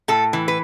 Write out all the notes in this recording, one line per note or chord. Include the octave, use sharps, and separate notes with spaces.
A2 A4
E3
B4